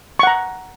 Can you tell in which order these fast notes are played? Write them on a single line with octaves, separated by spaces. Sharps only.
C#6 F#5 A#5